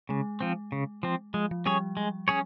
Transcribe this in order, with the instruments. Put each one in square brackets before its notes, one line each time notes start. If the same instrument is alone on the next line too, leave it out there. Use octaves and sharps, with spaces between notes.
[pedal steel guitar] C#3 [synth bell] G#3
[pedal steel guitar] F3 C4
C#3
F3 C4
[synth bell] F3 [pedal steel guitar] G#3
[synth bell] F3
[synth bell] G3 [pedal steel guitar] C#4 G#4 C#5
[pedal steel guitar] G#3
C#4 G#4 C#5